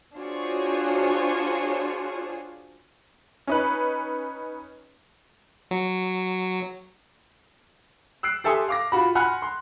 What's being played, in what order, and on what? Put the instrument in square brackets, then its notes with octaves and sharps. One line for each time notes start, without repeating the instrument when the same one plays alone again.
[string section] D4 F4 F#4 G#4 C5 C#5
[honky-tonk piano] C#4 D#4 B4
[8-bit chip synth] F#3
[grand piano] E6 F#6 C7 D7
G4 A4 E5 G#5 C6 D#6
F5 D6 A#6
F4 F#4 B5
F#5 G#5 B5 C6 F6 F#6
C6